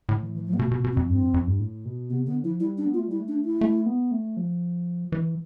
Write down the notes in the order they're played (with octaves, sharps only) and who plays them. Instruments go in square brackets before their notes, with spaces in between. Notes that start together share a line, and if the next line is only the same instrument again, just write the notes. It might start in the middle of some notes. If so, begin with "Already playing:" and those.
[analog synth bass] A2 [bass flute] D3
[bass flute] E3
E3
F3
B3
[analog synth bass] B2 [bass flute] A3
[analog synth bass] B2
[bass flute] B3
[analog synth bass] B2
[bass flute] C4
[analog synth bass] F2
[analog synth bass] G2 [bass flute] C4
[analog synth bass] F2
F2
G2
A2
B2
[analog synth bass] C3 [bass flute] B3
[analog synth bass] D3 [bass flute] B3
[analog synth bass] F3 [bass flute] E4
[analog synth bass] G3 [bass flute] E4
[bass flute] D4
[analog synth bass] B3
[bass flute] F4
[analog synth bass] A3
[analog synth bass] G3 [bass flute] E4
[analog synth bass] A3
[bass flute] D4
E4
[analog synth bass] A3
B3
A3
F3
E3